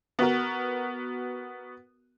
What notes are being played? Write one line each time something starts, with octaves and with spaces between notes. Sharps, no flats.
B3 F#4 A#4